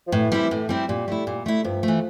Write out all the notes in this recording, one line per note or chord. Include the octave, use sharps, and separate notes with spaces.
F3
A2 E3
G3 C4 E4
A2
G3 C4 E4
A#2 G3
A3 E4
A#2
A3 E4
G2 F3
A3
E3